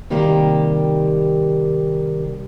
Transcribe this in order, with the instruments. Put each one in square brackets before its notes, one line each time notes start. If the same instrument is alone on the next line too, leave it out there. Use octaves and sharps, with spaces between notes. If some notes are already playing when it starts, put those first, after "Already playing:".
[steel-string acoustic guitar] C3 D#3 G3 A#3 G4